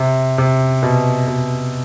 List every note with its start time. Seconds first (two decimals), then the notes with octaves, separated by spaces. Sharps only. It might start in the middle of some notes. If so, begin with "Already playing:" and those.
Already playing: C3
0.38 C3
0.83 B2
1.28 B2